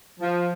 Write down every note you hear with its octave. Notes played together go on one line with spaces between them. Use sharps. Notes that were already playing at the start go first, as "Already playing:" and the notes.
F3